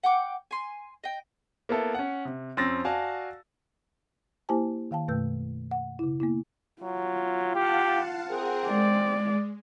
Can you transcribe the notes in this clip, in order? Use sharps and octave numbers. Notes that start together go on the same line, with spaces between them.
F#5 G5 D6
G#5 C6
D#5 G5
A#3 B3 E4 A4
C#4 F#5
C3
F2 C4 C#4 E6 A6 A#6
F#4 D5 F5 G#5 A5
A#3 E4 G4 C5 G#5 A5
D#3 F5 G5 A5
F#2 B2 A3 B4 E6 G6
F#5
C#3 E4
A#3 B3 E4
F#3 F4
G4 F5 F#5 A5
C4 G#4 A#4 F#5
G#3 D5